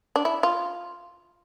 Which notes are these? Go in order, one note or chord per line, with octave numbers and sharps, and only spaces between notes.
D4
E4
F4